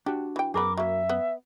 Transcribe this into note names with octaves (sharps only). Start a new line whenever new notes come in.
D4 F#4 G4
E3 G5
F#2 B3 G#4 A#4 B5 D6
F#3 A#3 E5
B3